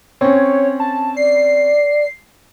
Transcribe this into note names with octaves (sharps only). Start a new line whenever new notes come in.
C4 C#4 C#5
A5
D5 C7